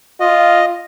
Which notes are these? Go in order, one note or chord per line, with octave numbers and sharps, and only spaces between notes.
F4 D#5